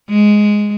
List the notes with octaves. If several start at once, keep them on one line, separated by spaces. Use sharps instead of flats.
G#3